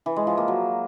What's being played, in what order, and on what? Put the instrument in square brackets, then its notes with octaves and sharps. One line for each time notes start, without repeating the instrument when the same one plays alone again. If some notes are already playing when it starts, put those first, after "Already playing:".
[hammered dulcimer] E3
G#3
F3
A#3
F#3